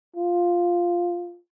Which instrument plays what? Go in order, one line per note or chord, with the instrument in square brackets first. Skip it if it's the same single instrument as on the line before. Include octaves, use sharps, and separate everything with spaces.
[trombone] F4